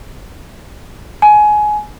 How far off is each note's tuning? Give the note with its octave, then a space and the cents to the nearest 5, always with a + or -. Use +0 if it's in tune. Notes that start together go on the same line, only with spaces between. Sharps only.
G#5 +20